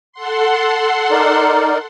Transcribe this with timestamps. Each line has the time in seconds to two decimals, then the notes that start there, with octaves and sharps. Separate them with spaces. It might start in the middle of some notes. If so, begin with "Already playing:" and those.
0.13 A4 F#5 C6
1.11 D#4 A#4 D5